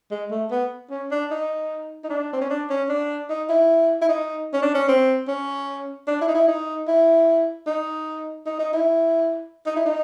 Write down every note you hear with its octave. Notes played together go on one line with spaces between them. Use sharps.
G#3
A3
B3
C#4
D4
D#4
D#4
D4
C4
C#4
D4
C#4
D4
D#4
E4
E4
D#4
C#4
D4
C#4
C4
C#4
D4
E4
D#4
E4
D#4
E4
D#4
D#4
D#4
E4
D#4
E4
D#4